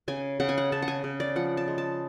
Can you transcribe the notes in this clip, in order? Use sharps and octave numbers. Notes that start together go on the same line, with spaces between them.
C#3 G#5
C#3 F#5
G#5
F#5
C#3 A5
F#5
G#5
C#3
D5
F3 F#5
A5
G#3
A5